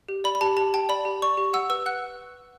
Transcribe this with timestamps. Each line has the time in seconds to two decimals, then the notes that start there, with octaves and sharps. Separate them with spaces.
0.09 G4
0.24 D5 B5
0.35 B5
0.41 G4 A5
0.57 G4 A5
0.74 G5 A5
0.89 D5 B5
1.05 G4
1.22 D5 C#6
1.37 G4
1.53 F#5 E6
1.70 B4 E6
1.86 F#5 F#6